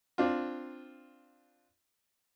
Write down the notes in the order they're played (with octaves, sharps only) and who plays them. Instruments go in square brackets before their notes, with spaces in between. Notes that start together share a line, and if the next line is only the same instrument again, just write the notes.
[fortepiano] C4 D4 F4